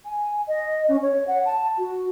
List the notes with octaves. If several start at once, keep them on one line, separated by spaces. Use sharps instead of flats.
G#5
D#5
C#4
C#5
F#5
A5
F#4